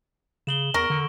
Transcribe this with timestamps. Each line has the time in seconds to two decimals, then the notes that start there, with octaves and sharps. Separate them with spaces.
0.47 C#3 E7 F#7 G7
0.74 E2 A#4 C#6 D7
0.90 D3